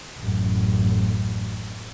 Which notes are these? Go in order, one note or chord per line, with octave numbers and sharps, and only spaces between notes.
A1 F#2